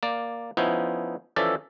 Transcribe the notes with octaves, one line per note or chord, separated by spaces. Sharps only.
A#3 D5
F3 B3 C#4 D#4 E4
E3 F3 C#4 A4 D5 E5